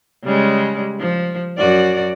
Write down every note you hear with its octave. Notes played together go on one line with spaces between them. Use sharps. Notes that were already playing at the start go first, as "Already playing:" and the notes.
C#3 G3 G#3
F3
F#2 F#4 D5